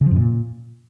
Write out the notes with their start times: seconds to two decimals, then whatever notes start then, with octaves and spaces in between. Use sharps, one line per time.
0.01 C#3
0.06 F3
0.11 F#2
0.16 A#2